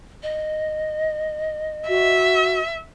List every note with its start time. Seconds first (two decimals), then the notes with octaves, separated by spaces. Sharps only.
0.23 D#5
1.88 F#4 E5